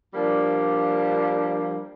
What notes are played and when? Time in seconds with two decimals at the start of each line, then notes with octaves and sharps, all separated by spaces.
0.14 F3 G3 A#3 D4